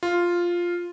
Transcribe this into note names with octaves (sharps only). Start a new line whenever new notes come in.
F4